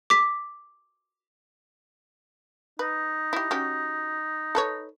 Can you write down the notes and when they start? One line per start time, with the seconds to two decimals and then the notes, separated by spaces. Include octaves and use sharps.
0.10 D6 B6
2.79 D#4 B4
3.33 E4 G4
3.51 C#4 F#4 G4
4.55 A4 B4 C#5